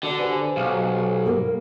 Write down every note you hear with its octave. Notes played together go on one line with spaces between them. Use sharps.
D3 F#4 D5 F#5
G4 B4 C5 G#5
B1 F5 F6
G3 A#3 A4 A#4